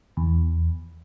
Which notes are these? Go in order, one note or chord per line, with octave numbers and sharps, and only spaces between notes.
E2